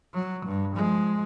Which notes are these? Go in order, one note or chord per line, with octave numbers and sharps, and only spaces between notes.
F#3
G2
F3 G#3